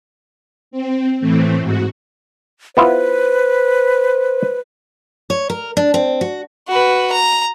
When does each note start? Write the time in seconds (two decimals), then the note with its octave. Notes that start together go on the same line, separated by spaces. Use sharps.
0.71 C4
1.20 A2 E3 A3 C4
1.60 G#2 F#4
2.77 B3 E4 F4 B4 C5
5.30 C#5
5.50 A#4
5.77 D4
5.94 C4
6.21 F#4
6.68 F#4 B4
7.12 A#5